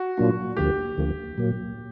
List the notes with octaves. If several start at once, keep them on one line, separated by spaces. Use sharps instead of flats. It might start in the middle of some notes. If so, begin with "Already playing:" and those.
Already playing: F#4
A#2 F#3 A#3 D4 F4
D2 D3 F3 A#3 G4
D2 D3 F3 A#3
A#2 F#3 A#3